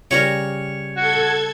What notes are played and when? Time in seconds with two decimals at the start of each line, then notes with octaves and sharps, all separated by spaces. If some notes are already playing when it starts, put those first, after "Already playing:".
0.11 C#3 G3 A#4 C#5
0.96 F#4 A4 G#6